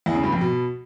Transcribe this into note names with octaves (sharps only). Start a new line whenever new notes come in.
E2
C#3
G2
F2
B2